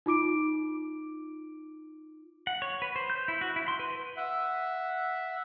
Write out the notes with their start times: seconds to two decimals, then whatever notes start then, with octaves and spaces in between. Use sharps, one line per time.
0.06 D#4 F4 D6 D7
2.47 F#5
2.62 C#5
2.82 B4
2.96 C5
3.10 G6
3.28 E4
3.41 F#4
3.56 E4
3.68 C6
3.79 B4
4.17 E5 F#5